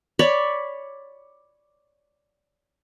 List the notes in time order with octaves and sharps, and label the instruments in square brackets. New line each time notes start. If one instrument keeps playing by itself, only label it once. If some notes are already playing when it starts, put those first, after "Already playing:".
[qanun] C#5 D5 B5 C#6